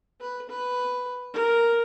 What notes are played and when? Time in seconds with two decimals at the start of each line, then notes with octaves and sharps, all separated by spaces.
0.21 B4
0.49 B4
1.34 A#4